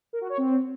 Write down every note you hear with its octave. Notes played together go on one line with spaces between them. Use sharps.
A#4
F#4
C#5
C4